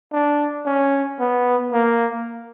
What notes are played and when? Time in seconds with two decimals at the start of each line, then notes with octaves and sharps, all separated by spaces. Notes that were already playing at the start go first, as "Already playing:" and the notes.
0.13 D4
0.66 C#4
1.20 B3
1.72 A#3